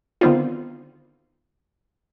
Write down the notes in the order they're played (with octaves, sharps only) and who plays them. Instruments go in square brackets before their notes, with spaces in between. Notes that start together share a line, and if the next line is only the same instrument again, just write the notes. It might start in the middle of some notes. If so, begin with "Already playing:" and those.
[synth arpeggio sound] D3 D#3 B3 C4 D#4 F4